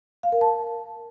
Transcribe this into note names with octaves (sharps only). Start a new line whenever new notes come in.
F5
A#4
A5